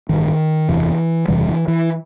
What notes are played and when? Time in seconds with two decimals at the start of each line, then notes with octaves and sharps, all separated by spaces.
0.09 A1 G2 D#3
0.69 F#1 E2 C3 E3
1.28 F#1 E2 C3 E3 G3
1.48 E3
1.68 E3